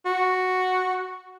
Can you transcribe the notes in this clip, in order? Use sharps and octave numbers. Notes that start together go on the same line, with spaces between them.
F#4